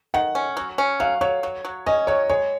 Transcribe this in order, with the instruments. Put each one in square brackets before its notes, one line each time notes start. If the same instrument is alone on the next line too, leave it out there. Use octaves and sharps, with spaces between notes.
[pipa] D#3 [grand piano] F#5
[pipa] C#4
F#3
C#4
[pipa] F#3 [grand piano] F5
[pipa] F#3 [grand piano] C#5
[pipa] F#3
F#3
[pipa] C#4 [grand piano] D#5
[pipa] F#3 [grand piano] C#5
[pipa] G#3 [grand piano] C#5